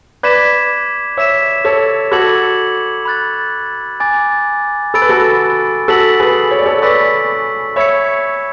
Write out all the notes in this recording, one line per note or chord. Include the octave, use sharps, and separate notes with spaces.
B4 D5 D6 G#6 B6 E7
C#5 E5 E6 B6 E7
A4 C#5
F#4 A4 B5 D6 G#6 C#7 F#7
B5 F#6 A6
G#5 D6 A6
A4 B5 E6 A6 D7
B4
F#4 A4
F#4 A4 E6 B6 F#7
G#4 B4
C#5
D5
A4 C#5
B4 D5 C#6 E6 B6
C#5 E5 B5 E6 G#6 C#7